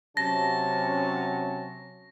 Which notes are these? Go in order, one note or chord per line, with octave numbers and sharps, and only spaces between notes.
C3 F#3 C#4 A5 A#6